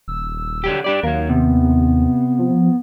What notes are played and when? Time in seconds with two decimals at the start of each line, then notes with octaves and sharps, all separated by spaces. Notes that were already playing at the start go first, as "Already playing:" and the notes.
0.08 D#1 E6
0.64 D3 F#3 G4
0.84 D4 G4 D5
1.03 D#2 F#3 A#4 F5
1.29 C3 B3
2.39 F3